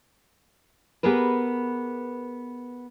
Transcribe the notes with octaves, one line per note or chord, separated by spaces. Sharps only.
B3 G4 G#4 A#4 B4